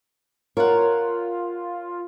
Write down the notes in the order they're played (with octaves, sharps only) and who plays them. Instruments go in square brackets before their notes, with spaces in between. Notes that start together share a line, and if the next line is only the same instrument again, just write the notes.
[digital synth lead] F4 [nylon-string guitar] A#4 [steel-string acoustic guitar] C#5 F#5